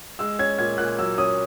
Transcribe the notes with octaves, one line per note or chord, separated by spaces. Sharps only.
G#3 E6
C#4 G#6
A#2 G#6
A#2 F#6
F#3 E6
C#4 D#6